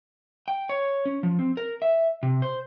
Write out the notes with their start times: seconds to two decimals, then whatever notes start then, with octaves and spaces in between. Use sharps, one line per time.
0.48 G5
0.69 C#5
1.05 C#4
1.23 F3
1.39 C4
1.57 A#4
1.82 E5
2.23 C3
2.42 C5